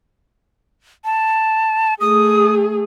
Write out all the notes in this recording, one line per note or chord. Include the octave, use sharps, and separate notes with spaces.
A5
A3 G#4 D#6